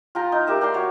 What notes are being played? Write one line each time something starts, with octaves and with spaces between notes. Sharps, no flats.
F4 G5 A#5
D#4
G4 A#4 E5
D5 G5 A#5 C6
F#4 C#5